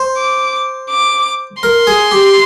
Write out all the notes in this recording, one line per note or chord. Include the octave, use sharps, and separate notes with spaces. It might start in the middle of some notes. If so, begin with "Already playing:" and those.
Already playing: C5
D6
D6
A#4 C6
G#4
G4